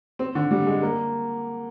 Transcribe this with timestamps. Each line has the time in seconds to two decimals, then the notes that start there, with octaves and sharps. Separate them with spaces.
0.19 C4
0.35 D3
0.51 G3
0.67 G#3
0.82 A#3